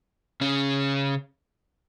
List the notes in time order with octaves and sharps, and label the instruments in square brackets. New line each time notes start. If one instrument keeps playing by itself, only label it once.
[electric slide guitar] C#3 C#4